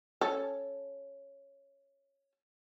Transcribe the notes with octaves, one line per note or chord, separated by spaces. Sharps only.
C#4 A4